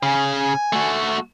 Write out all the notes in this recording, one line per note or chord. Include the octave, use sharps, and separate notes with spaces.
C#3 G#5
A3 F#4